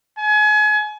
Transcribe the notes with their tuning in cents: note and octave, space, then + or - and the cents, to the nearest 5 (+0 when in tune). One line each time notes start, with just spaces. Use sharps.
G#5 +35